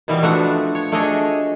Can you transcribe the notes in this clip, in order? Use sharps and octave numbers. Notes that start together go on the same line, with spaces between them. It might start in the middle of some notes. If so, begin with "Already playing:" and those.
B2 E3 G3 B3
F3 A3 D4 F#4
C#5
A3 D4 G#4 C#5 D#5